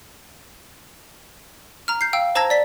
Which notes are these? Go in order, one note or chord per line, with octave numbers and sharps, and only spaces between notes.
A#5 F6
G6 C7
F5 G5 E6
C5 A5 A#5 E6 G#6 A#6
D5 B6